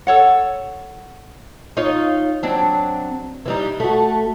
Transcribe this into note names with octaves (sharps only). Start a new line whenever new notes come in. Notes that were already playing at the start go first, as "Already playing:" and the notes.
A4 C#5 F#5
D#4 F4 C#5
F#3 C4 D4
E3 G3 D#4
A3 F#4